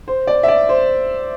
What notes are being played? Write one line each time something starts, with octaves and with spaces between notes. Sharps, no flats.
C5
D5
E5
D5
C5